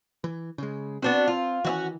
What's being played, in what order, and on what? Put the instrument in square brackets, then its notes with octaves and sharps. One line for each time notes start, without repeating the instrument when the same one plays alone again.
[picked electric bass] E3
C#3 G#3
[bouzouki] B3 D4 F#4 [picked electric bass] C4
[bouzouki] F4
[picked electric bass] D#3 E3 [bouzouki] C#4 E4 F#4